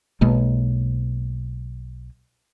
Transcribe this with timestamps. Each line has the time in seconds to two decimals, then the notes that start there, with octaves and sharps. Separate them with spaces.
0.21 B1 B2 G#3 A#3